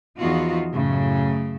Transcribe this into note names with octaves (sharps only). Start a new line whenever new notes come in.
E2 F3 B3 D#4 F4 F#4
F#2 A2 C#3